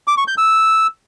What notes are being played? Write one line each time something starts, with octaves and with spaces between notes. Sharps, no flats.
D6
C#6
G6
E6